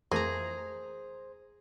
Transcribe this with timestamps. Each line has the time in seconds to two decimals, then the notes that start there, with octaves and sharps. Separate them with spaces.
0.11 F2 E3 A3 A#3 G#4 C5 A#5